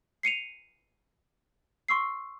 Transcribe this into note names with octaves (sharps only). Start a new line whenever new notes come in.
C7 C#7 D#7 F7
C6 C#6 E6 C7